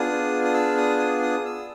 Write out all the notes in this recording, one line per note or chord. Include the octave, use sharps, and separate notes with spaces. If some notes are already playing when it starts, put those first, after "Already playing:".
Already playing: B3 D4 F4 G#4 D#6
D#6
E6
D#6
D#6
D#6
E6